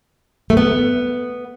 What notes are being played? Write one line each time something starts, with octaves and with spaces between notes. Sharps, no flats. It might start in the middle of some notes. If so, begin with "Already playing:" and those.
A3
B3